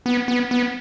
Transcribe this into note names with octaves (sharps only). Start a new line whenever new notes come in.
B3
B3
B3